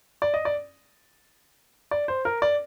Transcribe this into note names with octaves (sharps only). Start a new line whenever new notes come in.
D5
D#5
D5
D5
C5
A#4
D5